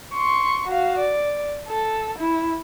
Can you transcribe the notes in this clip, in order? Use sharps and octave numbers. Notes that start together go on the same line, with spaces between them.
C6 C#6
F#4 F5
D5
A4
E4